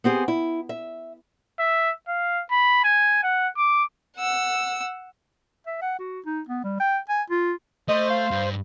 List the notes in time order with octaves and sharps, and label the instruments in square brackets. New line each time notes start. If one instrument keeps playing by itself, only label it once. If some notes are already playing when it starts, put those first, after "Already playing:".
[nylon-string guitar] B3 C4 G4 G#4
E4
E5
[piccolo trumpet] E5
F5
B5
G#5
F#5
D6
[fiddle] F#5 E6
[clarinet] E5
F#5
F#4
D#4
B3
G3
G5
G#5
F4
[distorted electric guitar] A3 [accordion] C5 [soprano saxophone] D#5
[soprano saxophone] F5
[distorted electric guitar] G2